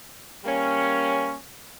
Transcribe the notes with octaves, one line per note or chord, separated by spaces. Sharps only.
G3 A#3 C#4